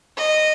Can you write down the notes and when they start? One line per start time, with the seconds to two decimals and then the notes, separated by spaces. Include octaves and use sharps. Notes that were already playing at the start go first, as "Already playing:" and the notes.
0.17 D#5